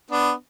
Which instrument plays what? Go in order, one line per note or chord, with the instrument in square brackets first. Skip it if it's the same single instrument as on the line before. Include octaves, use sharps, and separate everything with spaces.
[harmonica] B3 D4